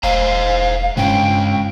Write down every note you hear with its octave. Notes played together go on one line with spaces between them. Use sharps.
E1 C5 D#5 F5 A#5
G2 G#3 C#4 G5